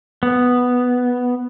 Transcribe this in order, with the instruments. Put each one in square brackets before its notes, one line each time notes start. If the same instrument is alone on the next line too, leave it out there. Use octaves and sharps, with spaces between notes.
[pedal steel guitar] B3